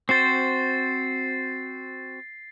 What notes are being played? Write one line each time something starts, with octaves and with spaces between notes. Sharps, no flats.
C4 F#4 C5 A6 C7